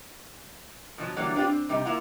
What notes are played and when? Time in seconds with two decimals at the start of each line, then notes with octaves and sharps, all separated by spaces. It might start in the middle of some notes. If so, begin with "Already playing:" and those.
0.98 B2 F3 F#3
1.16 D3 E3 F#3 G3 A#3
1.34 B3 C4 D4 F4 G4
1.50 C4
1.69 C3 G3 D#4
1.85 A#3 E4 F4 F#5